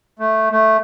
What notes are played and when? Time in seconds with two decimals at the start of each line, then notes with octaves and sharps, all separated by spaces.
0.19 A3
0.51 A3